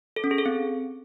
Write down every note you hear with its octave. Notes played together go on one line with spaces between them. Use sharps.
A4
C#4
G#4
A4
C4